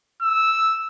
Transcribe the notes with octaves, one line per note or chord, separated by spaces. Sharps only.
E6